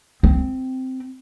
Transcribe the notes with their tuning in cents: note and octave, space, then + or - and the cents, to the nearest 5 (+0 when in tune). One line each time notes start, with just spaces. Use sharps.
C4 -10